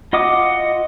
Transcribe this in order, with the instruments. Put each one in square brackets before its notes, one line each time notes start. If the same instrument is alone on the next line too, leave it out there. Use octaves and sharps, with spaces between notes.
[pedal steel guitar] F4 D#5 F#5 D6 D#6